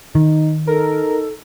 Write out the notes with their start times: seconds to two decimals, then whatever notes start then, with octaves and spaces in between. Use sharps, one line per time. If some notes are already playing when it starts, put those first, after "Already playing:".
0.15 D#3 D#4
0.67 D#4 A4 A#4